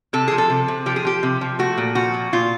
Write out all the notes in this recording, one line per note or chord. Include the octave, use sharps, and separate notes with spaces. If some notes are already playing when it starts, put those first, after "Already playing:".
C3 A4
F3 G#4
A4
C3
C3
F3 G4
G#4
F3 G4
C3
F3
A3 F#4
A#2
F3 F#4
A#2
A#2 F4